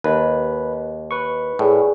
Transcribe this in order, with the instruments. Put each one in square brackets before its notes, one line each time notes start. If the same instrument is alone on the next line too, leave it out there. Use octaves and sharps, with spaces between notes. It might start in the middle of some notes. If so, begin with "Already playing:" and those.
[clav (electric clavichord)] D#2 [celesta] A#4 D#5 [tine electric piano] B4
[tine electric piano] B4 C#6
[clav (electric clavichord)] A2 [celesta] G#4 D5 G#5